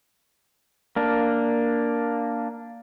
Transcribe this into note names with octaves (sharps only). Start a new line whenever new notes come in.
A#3 D4